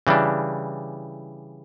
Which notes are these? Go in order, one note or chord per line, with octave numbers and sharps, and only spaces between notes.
C#3 E3 G3 D4